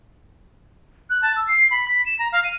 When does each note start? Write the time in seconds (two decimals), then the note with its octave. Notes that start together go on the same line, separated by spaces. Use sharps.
1.10 F#6
1.22 A5
1.36 E6
1.48 C7
1.71 B5
1.88 B6
2.06 E7
2.19 A#5
2.33 F5
2.44 D#7